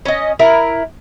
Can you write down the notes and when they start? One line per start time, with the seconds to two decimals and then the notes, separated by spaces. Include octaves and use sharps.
0.05 C#4 D#5
0.39 E4 A#4